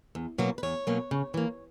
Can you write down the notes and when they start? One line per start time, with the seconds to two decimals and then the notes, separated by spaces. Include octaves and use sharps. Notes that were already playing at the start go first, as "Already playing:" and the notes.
0.15 E2
0.38 B2 F#3 A#3 C#4
0.58 B4
0.63 E2 C#5
0.87 B2 F#3 A#3 C#4
1.11 C#3
1.34 E3 A#3